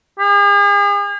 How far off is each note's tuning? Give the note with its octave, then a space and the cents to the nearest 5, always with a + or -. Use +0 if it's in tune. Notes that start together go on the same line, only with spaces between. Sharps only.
G#4 -45